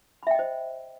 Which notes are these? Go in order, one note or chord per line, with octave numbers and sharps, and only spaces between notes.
C5 D#5 E5 G5 B5